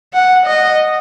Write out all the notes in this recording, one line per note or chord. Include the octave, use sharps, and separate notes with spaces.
F#5
D#5